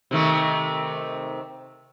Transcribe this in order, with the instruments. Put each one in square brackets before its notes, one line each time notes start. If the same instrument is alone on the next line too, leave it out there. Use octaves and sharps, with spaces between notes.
[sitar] C3 D#3 A3